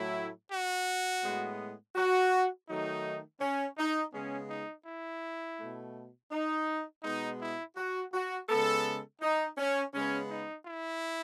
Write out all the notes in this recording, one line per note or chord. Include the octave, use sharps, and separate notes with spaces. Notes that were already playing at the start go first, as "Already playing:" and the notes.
Already playing: A2 F#3 A3 E4
F#4
A2 G#3 B3
F#4
D#3 F#3 A3 D#4
C#4
D#4
C#3 G#3 B3 C#4
D#4
E4
B2 A3
D#4
B2 G#3 B3 D#4
E4
F#4
F#4
C#3 G#3 B3 A4
D#4
C#4
C#3 G#3 B3 C#4
D#4
E4